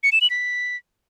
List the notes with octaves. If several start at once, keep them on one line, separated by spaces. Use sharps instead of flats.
C#7
E7
F#7
B6